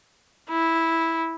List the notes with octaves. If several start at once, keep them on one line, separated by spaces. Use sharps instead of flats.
E4